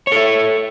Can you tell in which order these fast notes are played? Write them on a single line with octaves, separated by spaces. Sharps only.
C#5 A4 E5